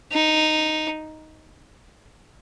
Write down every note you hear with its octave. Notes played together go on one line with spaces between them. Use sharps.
D#4